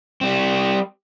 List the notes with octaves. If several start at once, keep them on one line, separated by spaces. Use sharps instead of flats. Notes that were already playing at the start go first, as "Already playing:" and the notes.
G3 C4